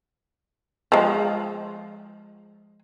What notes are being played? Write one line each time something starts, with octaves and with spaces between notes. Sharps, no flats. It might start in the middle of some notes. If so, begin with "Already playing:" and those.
F3 G#3